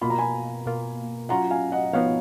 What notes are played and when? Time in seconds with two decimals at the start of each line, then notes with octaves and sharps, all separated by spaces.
0.01 B2 A#3 F4 B5
0.10 A#5
0.18 G#5 B5
0.66 B2 A#3 F4
1.29 F#3 C#4 F4 F#5 A#5
1.51 F5 G#5
1.72 D#5 F#5
1.93 F3 B3 D#4 C#5 F5